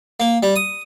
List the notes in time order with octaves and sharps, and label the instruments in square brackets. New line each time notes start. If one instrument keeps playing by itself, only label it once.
[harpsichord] A#3
G3
D#6